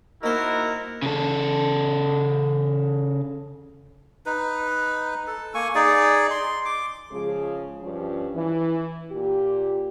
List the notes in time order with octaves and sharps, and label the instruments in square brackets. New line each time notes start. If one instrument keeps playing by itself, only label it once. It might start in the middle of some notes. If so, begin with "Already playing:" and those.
[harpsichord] A#3 C5 [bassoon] D#4 [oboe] E4 [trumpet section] F#4 A#4
[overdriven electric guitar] C#3 A4
[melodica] D#4 B4
A4
A#3 G#5 C#6
D#4 G#4 D5
C6
D6
[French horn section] C#3 F3 G#3 G#4
G2 F3 C#4
E3
A#2 G4